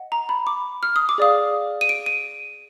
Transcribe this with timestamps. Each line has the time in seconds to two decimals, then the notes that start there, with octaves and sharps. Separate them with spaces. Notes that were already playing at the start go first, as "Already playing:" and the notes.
Already playing: D#5 F#5
0.12 A#5
0.29 B5
0.47 D6
0.83 F6
0.96 D#6
1.09 D6
1.18 G#4 D5 F5 D#6
1.81 D#7
1.89 D7
2.06 D#7